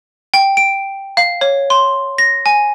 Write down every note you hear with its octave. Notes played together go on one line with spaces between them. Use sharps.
G5
D7
F5
C#5
C6
A#6
G#5